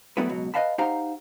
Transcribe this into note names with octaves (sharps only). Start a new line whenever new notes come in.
F#3 G3 A3 B3 E4 B4
C#2 B2 F#3
B4 C5 D#5 F5 A5 B5
D#4 G4 C5 F5 F#5 A#5